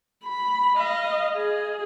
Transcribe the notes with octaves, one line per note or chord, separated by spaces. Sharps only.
B5
D#5 F5
G#4